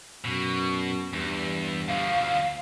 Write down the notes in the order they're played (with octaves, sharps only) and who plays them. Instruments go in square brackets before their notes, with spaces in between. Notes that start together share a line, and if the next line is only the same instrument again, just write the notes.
[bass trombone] F#2 [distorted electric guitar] B2
[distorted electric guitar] E2 [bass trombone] G2
[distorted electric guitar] D2 F3 [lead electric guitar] F5